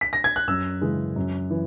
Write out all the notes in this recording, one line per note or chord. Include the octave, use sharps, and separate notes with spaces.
B6
A#6
G#6
F#6
F#2 E6
C#3 E3 G#3
F#2
E3